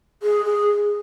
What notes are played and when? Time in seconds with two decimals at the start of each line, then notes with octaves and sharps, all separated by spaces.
0.22 G#4
0.45 G#4